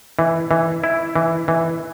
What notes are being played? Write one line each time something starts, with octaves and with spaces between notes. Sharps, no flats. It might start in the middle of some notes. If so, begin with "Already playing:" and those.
E3
E3
E4
E3
E3